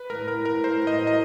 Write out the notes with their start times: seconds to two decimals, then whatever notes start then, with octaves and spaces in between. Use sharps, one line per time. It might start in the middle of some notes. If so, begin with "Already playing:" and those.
Already playing: B4
0.10 A2 A#4
0.28 A2 A#4
0.45 A2 A#4
0.64 A3 C5
0.82 A2
0.87 D#5
0.99 F#3
1.07 D#5